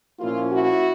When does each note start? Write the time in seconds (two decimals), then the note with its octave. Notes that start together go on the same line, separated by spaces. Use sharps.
0.20 A#2 F3 A#3 C#4 E4 F4
0.51 E4 F#4